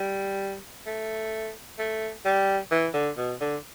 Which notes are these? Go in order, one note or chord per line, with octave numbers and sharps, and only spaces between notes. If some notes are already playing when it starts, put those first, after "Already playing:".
Already playing: G3
A3
A3
G3
E3
D3
B2
D3